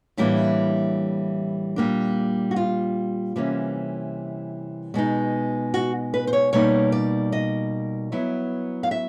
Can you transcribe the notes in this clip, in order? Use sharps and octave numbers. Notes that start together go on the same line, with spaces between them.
A2 E3 G3 A#3 D4 E4
A#2 G3 A#3 D4
F#4
F4
C3 E3 G3 A#3 C#4
B2 G#3 B3 D#4
F#4
B4
C5
C#5
B2 G3 A#3 D#4 C#5
D5
D#5
F#3 B3 E4
F5
E5